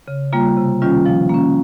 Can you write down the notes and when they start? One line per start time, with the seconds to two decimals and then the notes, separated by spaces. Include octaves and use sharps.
0.08 C#3
0.33 G3 A#3 F4
0.57 C3
0.82 D#3 G3 C#4 F4
1.06 F3
1.29 A#3 C#4